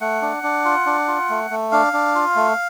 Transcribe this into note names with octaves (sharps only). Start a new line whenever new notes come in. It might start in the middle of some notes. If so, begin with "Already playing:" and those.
A3 F#5
D4
D4
F4
D4
F4
A3
A3
D4 F5
D4
F4
A3